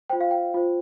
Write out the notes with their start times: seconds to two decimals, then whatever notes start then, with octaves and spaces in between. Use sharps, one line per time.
0.10 F4 C5 G5
0.21 F5
0.31 G5
0.54 F4 C5